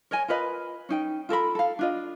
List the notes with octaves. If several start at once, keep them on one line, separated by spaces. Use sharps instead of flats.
A#4 C#5 D#5 G#5
F4 A#4 B4 D#5
C#4 D#4 G5
F4 A4 A#4 B5
A4 F5
D4 F4 D#5